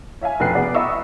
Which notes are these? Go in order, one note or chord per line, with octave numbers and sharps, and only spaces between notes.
C#5 E5 F5 G#5
F1 B1 F#4 B4 F#6 C7
B3 G#4 D5 F#5
D#5 E5 A#5 B5 C#6 E6